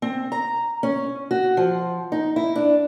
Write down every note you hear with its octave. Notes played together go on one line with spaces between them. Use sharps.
C4
A#5
C#4
F#4
F3
D#4
E4
D4